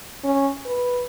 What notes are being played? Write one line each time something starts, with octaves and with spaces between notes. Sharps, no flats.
C#4
B4